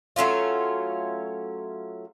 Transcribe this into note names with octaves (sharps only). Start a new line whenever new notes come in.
F#3 A3 C#4 F4